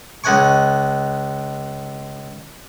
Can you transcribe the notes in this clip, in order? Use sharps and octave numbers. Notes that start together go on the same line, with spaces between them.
C#2 D#4 F#5 G#5 C#6